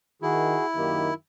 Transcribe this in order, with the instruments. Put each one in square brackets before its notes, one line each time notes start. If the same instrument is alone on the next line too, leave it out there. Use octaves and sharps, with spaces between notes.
[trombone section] D#3 [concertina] E4 [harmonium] F#4 G#4
[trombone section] F#2 D#3 [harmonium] A#3 G4